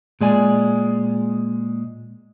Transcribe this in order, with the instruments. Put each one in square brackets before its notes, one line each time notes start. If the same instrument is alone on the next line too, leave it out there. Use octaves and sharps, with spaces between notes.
[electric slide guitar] A#2 G#3 D5 G#5